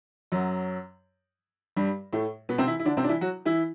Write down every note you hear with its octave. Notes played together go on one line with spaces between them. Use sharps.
F#2 F#3
G2 G3
A2 A3
B2 B3
C3 C4
E3 E4
E4
D3 D4
C3 C4
D4
E3 E4
F#3 F#4
E3 E4